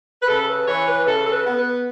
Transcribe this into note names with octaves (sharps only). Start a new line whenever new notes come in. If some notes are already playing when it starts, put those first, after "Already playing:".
B4
C#3 A4
B4
E3 C#5
B4
C#3 A4
A4
B4
B3
B4